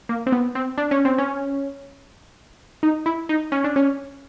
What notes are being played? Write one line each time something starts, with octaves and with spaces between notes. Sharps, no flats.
A#3
C4
B3
C4
D4
C#4
C4
C#4
D#4
E4
D#4
C#4
D4
C#4